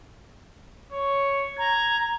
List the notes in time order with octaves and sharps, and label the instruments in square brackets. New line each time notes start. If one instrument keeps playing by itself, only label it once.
[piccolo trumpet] C#5
[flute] A#5 [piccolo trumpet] G#6